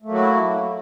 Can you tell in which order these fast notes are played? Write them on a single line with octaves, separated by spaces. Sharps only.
A3 A#3 F#3 F#4 E4